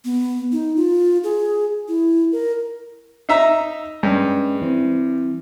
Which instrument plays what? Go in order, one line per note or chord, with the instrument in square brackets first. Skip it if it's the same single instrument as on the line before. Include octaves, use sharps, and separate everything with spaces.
[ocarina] B3
D#4
F4
G#4
E4
A#4
[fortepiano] D#4 E5 A#5
[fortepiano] G2 [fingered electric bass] G#3 C#4
[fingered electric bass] E3 C4